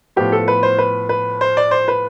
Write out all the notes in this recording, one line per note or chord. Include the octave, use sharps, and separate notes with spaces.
A2 F3 B3 G4
A4
B4
C5
B4
B4
C5
D5
C5
B4